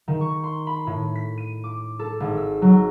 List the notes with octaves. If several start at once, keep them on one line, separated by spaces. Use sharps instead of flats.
D#3
C#6
C6
B5
A2
B6
D#7
D6
A4
G#1
E6
F#3